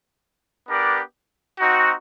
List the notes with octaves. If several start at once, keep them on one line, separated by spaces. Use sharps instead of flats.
B3 D4 G4 A#4 D5
C4 D#4 F#4